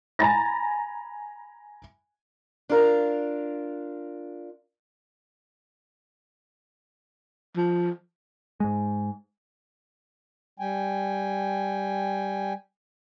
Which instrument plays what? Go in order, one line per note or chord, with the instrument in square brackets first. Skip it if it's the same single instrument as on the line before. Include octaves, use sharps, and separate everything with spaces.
[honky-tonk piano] G#5 A#5 B5 A6 A#6
[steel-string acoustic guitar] D4 F4 A#4
[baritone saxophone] F3
[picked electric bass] G#2 G#3
[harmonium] G3 G5 G#5